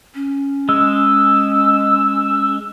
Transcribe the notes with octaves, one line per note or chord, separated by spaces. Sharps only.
C#4
G#3 E6